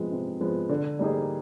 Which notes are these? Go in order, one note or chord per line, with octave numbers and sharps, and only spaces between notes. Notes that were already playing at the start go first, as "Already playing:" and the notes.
Already playing: C3 F3 G#3 B3
C3
F3 G#3 B3
D3
G3 A#3 D#4 G#4